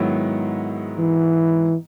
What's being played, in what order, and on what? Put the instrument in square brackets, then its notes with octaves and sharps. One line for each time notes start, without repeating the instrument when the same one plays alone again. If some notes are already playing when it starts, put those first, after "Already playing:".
Already playing: [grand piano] G#2 D#3 F#3 B3 E4
[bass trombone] E3